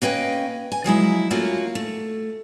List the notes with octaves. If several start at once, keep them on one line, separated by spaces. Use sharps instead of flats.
A#3 C#4 B4 D#5 G5
G#5
F3 F#3 G#3 E4
A3 A#3 C#4 F4 F#4
A3